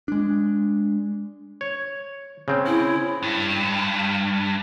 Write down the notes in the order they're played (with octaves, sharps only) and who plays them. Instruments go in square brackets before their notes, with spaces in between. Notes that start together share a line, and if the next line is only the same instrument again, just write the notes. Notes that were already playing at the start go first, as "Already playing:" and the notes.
[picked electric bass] G#3 D4
[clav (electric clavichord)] C#5
C#3 C4
[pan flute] E4
[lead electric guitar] G2